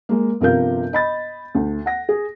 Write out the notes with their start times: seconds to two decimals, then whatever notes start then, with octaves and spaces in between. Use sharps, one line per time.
0.09 G#3 A#3
0.41 G1 C3 F3 A#4 F5 G6
0.93 D#5 B5 A6
1.55 D2
1.86 F#5 A#6
2.09 G#4